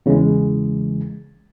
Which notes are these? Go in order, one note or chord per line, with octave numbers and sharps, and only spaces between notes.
E2 C#3 E3 G#3